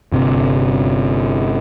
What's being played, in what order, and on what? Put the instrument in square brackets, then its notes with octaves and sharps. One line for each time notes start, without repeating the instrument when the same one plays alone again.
[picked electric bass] G1 C3